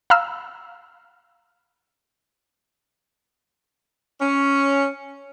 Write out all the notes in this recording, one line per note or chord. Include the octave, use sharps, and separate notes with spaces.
F5 A#5 B5 E6 F6
C#4